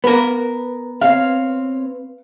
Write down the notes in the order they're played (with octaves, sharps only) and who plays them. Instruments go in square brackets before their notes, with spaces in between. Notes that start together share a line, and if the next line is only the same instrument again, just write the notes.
[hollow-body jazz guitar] B3 A#4 [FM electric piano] B4
[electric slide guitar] C4 C#5 [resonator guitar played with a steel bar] F5